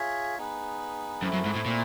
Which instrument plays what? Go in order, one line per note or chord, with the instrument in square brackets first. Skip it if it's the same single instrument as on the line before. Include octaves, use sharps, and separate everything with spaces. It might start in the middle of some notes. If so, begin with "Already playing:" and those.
Already playing: [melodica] F4 G#4 C#5 E5
B3 D#4 G#4 B4
[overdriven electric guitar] F#2 [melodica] A3 C4 E4
[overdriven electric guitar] F#2
G#2
A2
A#2